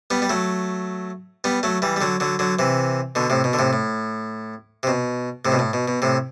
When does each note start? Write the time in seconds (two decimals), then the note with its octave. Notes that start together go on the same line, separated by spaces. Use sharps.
0.10 G3 B3
0.22 G3
0.30 F#3 A3
1.44 G3 B3
1.63 F#3 A3
1.82 E3 G3
1.96 G3
2.01 D3 F#3
2.20 D3 F#3
2.39 D3 F#3
2.59 C3 E3
3.15 B2 D3
3.30 A2 C3
3.44 B2
3.53 D3
3.59 A2 C3
3.73 A2
4.83 C3
4.87 B2
5.45 A2 C3
5.52 B2
5.59 A2
5.73 B2
5.88 B2
6.02 A2 C3